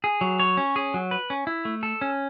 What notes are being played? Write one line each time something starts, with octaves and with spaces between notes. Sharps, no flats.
G#4
F#3
C#5
C#4
G#4
F#3
B4
C#4
E4
A3
A4
C#4